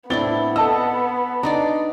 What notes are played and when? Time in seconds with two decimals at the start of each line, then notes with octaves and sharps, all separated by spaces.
0.10 A2 B3 C4 D4 E4 A6 G7
0.56 A4 D#5 A5 E6
1.43 D4 D#4 D5 A#5